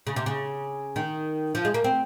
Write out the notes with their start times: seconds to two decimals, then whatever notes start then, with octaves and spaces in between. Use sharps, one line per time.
0.07 C#3
0.16 C3
0.26 C#3
0.96 D#3
1.55 F3
1.65 G#3
1.74 A#3
1.84 C4